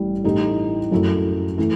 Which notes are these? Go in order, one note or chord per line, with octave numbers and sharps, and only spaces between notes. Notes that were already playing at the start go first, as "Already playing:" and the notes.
Already playing: A1 A2 G3
A2 E3 A3 D#4 G4
F#2 F#3 A3 E4
E3 A3